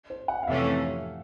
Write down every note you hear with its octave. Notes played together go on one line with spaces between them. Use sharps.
C5
F#5
F5
F2 C3 E3 A3 C#4 E5